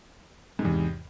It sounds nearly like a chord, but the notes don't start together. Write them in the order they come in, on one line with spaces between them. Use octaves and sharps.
G#2 C3 E2